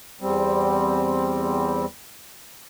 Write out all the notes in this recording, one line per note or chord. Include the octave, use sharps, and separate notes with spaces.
E2 G3 C4